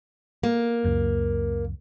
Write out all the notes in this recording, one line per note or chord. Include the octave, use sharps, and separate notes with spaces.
A#3
C#2 F#2